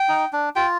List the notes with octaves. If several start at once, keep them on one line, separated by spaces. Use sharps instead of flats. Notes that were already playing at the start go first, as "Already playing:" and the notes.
Already playing: G5
D#4
D4
F4 G5